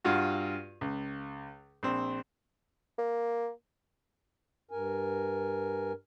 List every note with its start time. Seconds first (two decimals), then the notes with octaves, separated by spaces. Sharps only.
0.04 G2 F4 F#4
0.81 C#2
1.83 A#1 C4
2.98 A#3
4.71 G2 A#4 G#5